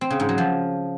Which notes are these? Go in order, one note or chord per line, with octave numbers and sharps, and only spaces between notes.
C4
C#3
G#2
F#3
F3